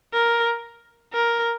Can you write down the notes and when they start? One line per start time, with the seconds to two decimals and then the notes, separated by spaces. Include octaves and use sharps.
0.13 A#4
1.13 A#4